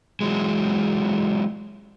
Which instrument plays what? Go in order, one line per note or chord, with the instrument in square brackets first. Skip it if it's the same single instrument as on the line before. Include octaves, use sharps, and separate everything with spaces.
[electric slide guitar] E3 F#3 G#3